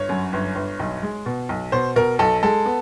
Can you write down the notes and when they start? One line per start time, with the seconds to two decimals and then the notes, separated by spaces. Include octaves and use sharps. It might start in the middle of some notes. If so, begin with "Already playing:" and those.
Already playing: G1 C#5
0.09 F#2
0.33 G1
0.56 G1
0.80 B1
1.03 G#3
1.26 B2
1.49 B1
1.72 B2 C5
1.96 B2 A#4
2.19 B1 A4
2.43 G#3 A4
2.66 B3